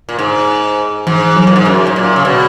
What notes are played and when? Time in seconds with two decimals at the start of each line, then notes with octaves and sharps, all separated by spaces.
0.09 A#2
0.19 G#2
1.07 G#2 E3
1.37 F#3
1.47 A#2
1.56 G#2
1.66 F#2
1.87 G#2
1.96 A#2
2.16 C#3
2.25 B2